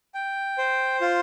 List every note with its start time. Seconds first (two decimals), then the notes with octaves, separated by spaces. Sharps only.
0.14 G5
0.58 C5
1.01 F4